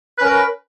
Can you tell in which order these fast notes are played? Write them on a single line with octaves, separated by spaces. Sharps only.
B4 C#4 A#4